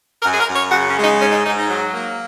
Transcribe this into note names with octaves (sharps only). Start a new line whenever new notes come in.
F#2 A#4
G#4
A#4
F#2
C#5
C#3 F#4
C#4
G#3
D#4
G#2 C#4
D#4
G#2 D#4
D#4
F#3
A#3